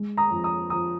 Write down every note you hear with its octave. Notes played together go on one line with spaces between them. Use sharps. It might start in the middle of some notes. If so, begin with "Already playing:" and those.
Already playing: G#3
A#5 D#6
F2
A#5 D#6
F3 A#5 D#6